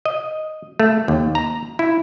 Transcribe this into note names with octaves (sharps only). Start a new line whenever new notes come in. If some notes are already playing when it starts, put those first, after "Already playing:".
D#5
A3
D#2
A#5
E4